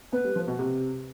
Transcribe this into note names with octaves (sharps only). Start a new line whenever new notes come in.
B3 B4
G3
F3
B2
C3